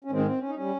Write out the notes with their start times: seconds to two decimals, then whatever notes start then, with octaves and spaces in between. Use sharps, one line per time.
0.04 C#4
0.11 G#2 D#3 G#3 C4
0.26 C4
0.40 C#4
0.48 D#4
0.55 G3 C#4